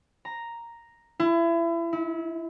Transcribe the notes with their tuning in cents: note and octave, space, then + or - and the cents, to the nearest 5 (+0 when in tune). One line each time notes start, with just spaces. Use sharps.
A#5 +0
E4 +30
E4 -30